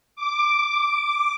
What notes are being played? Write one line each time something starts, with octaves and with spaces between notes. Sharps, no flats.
D6